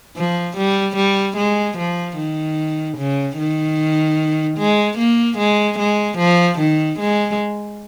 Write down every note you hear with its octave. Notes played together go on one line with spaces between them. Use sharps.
F3
G3
G3
G#3
F3
D#3
C#3
D#3
G#3
A#3
G#3
G#3
F3
D#3
G#3